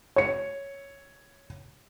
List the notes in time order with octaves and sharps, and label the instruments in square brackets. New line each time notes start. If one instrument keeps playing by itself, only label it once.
[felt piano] C#5 C#7